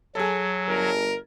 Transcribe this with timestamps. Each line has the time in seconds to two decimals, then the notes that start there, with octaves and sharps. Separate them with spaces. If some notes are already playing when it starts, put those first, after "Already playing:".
0.15 F#3 G#4 A4
0.67 G1 A#4